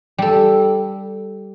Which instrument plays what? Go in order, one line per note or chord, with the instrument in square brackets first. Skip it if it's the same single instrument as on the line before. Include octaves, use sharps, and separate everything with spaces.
[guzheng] G3 A4